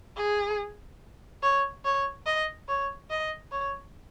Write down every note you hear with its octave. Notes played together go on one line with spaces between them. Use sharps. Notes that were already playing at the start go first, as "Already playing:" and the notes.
G#4
C#5
C#5
D#5
C#5
D#5
C#5